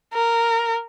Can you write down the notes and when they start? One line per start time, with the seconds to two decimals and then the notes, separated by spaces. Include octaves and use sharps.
0.13 A#4